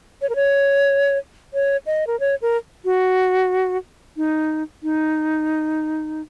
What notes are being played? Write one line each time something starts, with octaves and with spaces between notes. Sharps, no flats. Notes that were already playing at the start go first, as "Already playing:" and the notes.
C#5
A#4
C#5
C#5
D#5
A#4
C#5
A#4
F#4
D#4
D#4